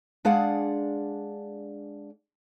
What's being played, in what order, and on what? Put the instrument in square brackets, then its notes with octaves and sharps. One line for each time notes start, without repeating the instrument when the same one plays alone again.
[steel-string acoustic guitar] G#3 D4 G#4 D5 F5 F#5